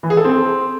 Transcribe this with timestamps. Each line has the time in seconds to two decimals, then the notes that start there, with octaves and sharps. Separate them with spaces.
0.03 E3
0.10 G#4
0.17 A4
0.24 C4